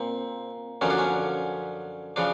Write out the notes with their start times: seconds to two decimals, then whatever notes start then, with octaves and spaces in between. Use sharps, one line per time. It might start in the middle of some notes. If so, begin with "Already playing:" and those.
Already playing: A#2 C4
0.81 F#2 D3 F3 C#4
0.90 D4
0.98 C#4
2.16 C#3 F3 D4